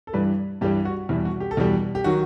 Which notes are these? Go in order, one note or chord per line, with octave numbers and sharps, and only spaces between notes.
A4
G2 E3 G3 B4
G2 E3 G3 G4
F#4
E2 B2 G3 E4
F#4
G4
A4
E2 B2 G3 G4
G4
D#3 F#3 F#4